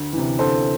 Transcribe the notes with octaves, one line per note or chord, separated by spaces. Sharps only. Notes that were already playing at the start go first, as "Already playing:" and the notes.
Already playing: D2
C3 E3
D2 A4 C5